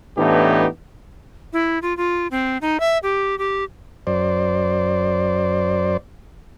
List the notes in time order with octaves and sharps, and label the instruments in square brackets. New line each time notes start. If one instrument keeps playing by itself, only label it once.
[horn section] A2 E3 B3 D4 D#4 G4
[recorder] E4
F4
F4
C4
D#4
E5
G4
G4
[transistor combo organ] F#2 C5 D5